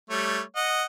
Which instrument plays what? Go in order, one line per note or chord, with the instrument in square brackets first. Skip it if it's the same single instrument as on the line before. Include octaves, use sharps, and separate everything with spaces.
[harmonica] G3 A3 C#5
D#5 F#5